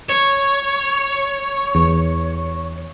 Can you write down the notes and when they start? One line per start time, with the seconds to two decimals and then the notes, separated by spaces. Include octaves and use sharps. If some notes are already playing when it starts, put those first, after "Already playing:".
0.10 C#5
1.75 E2